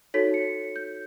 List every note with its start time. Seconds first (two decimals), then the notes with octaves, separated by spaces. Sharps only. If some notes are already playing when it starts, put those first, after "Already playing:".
0.14 D#4 F#4 A4 C#5 B6
0.34 C#7
0.76 G6